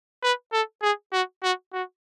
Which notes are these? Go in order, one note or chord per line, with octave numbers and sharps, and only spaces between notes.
B4
A4
G#4
F#4
F#4
F#4